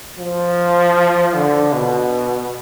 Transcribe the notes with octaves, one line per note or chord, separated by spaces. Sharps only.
F3
D3
B2